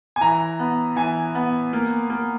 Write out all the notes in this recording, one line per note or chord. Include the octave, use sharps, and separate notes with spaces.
G#5
E3 A#5
B3
E3 G#5
B3
A#3
A#3